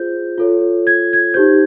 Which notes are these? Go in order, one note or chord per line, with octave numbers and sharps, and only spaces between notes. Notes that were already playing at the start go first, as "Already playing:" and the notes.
Already playing: F4 G#4 C5 G6
F4 A4 C#5
G#6
G#6
D#4 G4 C5 G6